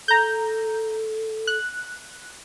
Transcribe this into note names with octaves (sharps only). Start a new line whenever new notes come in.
A4 A#5 G6
F#6